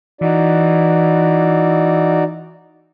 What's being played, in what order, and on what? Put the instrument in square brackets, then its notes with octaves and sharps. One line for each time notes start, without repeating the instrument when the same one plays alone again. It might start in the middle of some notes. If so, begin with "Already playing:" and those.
[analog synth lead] E3 [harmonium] D#4 F#4 D5